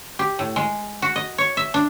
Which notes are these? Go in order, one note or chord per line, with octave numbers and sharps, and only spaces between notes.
G4
A2
G#3
F#4
D#5
C#5
E5
D4